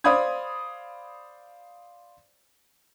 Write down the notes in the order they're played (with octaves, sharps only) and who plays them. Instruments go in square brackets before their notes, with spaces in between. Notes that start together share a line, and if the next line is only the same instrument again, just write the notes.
[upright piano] C5 D5 F5 B5 D#6 G#6